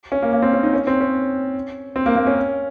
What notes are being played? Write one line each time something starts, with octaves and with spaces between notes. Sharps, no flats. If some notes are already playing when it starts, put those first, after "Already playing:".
C#4
A#3
A#3
C4
C#4
D#4
C#4
C4
C#4
C4
A#3
A#3
C#4